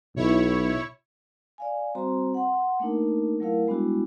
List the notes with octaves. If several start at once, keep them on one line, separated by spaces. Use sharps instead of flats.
B1 B2 E4 C#5
D5 F5 G#5
G3 C4 F#4 C5 A#5 C6
F#5 C6
A3 A#3 D4 D#4 A#4
F#3 A3 E4 A#4 F5
G3 G#3 B3 D4 E4 F#4